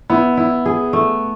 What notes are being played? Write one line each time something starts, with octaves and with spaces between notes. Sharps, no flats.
B3 E4
E4
G#4
A3